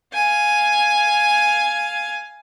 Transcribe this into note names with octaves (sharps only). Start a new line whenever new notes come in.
F5 G#5